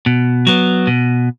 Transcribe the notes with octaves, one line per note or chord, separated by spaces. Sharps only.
B2
F#3 B3
B2